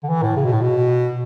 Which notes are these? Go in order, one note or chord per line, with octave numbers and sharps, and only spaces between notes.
D3
E3
A2
C#3
B2
A2
B2